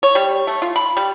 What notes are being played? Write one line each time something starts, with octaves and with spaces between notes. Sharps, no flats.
C#5
G3
A3
F4
B5
G3